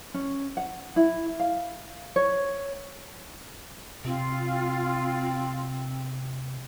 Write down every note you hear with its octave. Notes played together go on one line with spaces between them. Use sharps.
C#4
F#5
E4
F5
C#5
C3 C4 F4